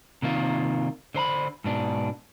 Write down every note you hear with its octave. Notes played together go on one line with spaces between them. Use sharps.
C3 D#3 A#3 F4
D3 C5 A#5 B5
G#2 B2 D4